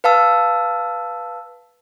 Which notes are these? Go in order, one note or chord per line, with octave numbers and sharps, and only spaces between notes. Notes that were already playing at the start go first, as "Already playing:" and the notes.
B4 F5 A5 E6